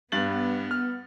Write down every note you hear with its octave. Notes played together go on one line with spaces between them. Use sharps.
G2 B3 A6 F#7
F6